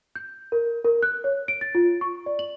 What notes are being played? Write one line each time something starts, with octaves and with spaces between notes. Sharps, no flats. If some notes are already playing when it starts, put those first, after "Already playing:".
G6
A#4
A#4
F#6
C#5
D7
A6
F4
C#6
D5
F#7